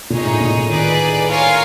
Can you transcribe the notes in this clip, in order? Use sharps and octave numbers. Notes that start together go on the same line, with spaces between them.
A#2 D#4 G#4 C#5
A2
A#2
A#2
D#3 D#4 G#4 B4 D5
F4 A#4 C#5 F5 G#5